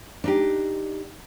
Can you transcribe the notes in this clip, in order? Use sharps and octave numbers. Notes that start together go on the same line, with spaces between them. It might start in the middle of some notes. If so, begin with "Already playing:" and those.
D4 D#4 G4